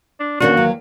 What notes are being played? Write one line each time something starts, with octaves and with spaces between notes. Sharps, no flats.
D4
E2 D#3 A#3 C#4 D4 F#4
F#3